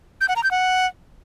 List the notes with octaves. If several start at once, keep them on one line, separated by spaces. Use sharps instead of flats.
G6
F#5
A#5
G6
F#5